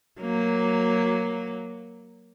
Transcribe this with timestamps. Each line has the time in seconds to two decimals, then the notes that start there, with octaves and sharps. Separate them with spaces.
0.21 F#3 A#3